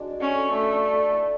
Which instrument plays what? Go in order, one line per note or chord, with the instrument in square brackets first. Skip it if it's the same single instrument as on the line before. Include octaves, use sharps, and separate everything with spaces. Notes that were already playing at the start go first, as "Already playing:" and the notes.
Already playing: [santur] G#3 D4 F#4
D5
[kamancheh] C#4
[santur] A4
[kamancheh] A3 [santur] D4
[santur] D4
A4
E4